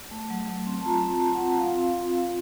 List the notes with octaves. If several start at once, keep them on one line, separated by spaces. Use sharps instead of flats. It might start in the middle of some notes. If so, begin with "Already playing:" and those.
A3
F#3
F#3
C4
A5
F4 A#5
C4
A5
F4
F#5
C4
F4 F5
C4
F4
C4